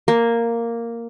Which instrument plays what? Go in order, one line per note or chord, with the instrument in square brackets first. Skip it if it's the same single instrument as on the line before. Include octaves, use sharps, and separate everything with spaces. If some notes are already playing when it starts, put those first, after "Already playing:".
[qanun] A#3